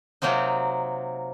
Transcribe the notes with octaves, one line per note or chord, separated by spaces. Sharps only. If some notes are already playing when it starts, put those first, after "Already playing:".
C3 F#3 A#3 C4 D#4